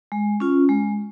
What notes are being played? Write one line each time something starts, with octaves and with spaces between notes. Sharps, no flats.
G#3
C#4 F4
G#3